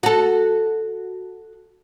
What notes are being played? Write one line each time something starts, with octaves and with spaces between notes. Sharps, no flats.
F#4 A4